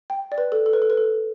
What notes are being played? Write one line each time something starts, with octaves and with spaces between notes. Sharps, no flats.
G5
D5
B4
A4
A4
B4
A4
B4
A4